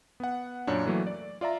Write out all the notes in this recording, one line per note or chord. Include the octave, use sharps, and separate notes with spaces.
B3 F#5
F#2 A#2 D4 C#5
E3 F#3 A3 A#3
D5
F4 D5 E5 A#5